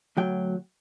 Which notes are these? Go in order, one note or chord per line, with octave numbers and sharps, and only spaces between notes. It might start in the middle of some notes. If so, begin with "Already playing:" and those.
D2 F#3 G5